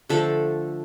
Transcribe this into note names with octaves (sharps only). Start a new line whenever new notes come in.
D3 F3 A3 A4